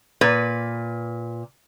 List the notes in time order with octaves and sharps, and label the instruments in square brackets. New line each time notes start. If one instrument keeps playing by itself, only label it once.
[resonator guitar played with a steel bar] A#2 B4